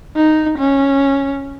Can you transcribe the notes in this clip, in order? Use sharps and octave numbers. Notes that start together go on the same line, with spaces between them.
D#4
C#4